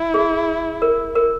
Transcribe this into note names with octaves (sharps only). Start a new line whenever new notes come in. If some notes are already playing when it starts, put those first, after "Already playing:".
Already playing: E4
G#4
A#4
A#4